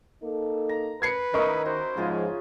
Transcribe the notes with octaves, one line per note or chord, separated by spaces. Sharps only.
A#3 D#4 A4
A#5
B4 G#6 C7 C#7
D#3 C#4 D#4 E4 A#4 D#5 C#6
F#4 C5
G#2 C#3 F3 F4 G#4